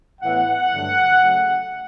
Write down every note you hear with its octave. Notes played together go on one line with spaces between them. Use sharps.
A2 E3 B3 F#5
G2 D3 F#3 A3
C#3 F#3 A3